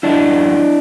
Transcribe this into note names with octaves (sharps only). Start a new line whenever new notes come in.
F#2 C#3 F#3 D4 E4